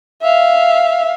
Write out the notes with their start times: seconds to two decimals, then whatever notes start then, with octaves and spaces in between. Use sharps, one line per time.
0.22 E5 F5